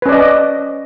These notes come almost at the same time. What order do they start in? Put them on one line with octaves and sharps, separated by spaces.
B4 C#4 D5 D#5